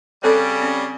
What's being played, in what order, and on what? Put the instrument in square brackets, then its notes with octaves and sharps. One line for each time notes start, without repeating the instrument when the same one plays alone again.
[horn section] C#3 G3 [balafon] C4 A4 C#5
[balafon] C4 C#4